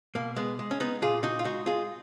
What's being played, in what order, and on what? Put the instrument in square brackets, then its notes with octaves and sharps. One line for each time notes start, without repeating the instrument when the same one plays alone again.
[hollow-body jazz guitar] B2 A#3
G#3 B3
G#3
C#4
B3 D#4
A#2 F4 G#4
D#4 F#4
F4
G#3 D#4 F#4
F4 G#4